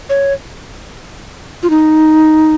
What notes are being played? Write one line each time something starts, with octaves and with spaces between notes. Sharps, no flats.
C#5
F4
D#4